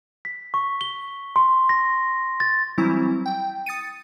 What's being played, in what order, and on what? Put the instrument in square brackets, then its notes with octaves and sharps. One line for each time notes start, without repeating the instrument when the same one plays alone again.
[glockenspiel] B6
C#6
G7
C6
A#6
A6
[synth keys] E3 F#3 G3 C4 E4
G5
D#6 A6 C#7 D#7